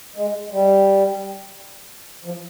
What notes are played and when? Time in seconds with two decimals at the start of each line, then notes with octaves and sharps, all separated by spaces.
0.16 G#3
0.51 G3
2.25 F3